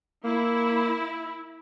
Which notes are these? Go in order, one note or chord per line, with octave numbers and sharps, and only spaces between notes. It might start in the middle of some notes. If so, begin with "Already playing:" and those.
A#3 E4